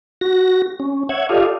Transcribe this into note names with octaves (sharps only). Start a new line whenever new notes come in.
F#4 A#6
C#4
C#5 E5 F#5 G#6
F4 G4 A4 D5 D#5 F5